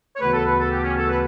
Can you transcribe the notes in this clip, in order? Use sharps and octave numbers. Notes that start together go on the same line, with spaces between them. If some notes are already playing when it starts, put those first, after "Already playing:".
C#5
D2 C#3 E3 B3 F#4 B4
A4
B4
A4
G4
C#4
A4
B4